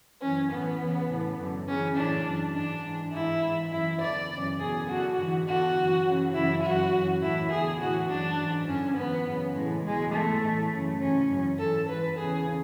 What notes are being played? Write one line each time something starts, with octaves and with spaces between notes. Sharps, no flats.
F#2 E3 C#4
A2 E3 B3
E2 C#3 E3
A2 E3
F#2 D3
F#2 C#3 E3 C#4
A2 E3 D4
F#2 E3
G#2 E3 D4
G#2 E3
G#2 E3 E4
G#2 E3
F#2 E3 E4
E2 D3 D5
F#2 C#3 E3
E2 B2 G#4
F#2 D3 F#4
G#2 E3
E2 D3 F#4
F#2 E3
F#2 C#3 E3
F#2 C#3 E3 E4
F#2 E3 F#4
F#2 E3
A2 E3 E4
E2 D3 G#4
A2 E3 F#4
F#2 E3 D4
G#2 E3
F#2 D3 C#4
G#2 E3 B3
F#2 C#3 E3
A2 E3 G#3
E2 B2 G#3
G#2 E3 A3
A2 E3
F#2 C#3 E3
G#2 E3 C#4
F#2 E3
G#2 E3 A4
G#2 E3 B4
E2 C#3 E3 G#4